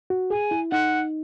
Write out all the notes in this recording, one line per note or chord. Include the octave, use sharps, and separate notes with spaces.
F#4
G#4 G#5
E4
D#4 F#5